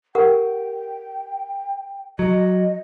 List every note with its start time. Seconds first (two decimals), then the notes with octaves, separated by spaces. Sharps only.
0.15 G4 A#4 F#5 G5
2.19 F#3 D#5